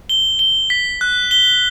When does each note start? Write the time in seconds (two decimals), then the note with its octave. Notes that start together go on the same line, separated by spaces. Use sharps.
0.09 G7
0.39 G7
0.70 B6
1.01 F#6
1.31 G7